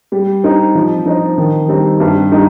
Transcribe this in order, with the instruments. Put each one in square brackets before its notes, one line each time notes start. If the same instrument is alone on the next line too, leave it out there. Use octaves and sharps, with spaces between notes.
[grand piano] G3
C4 D#4 G4
F3
D#4 C5 D#5
D#3
G3 C4 D#4
G2
G3 D#4